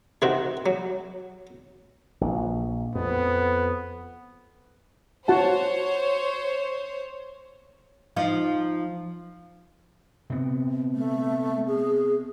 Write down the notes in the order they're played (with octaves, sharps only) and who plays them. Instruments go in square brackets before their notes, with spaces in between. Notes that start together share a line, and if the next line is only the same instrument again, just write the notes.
[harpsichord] C3 D#3 C4 F#4
F#3
[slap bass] A#1
[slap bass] F2 [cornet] B3
[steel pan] F#4 F#5 A5 [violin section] C5 C#5
[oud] F3 D#4 F4
[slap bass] C3 B3
[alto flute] A3
G#4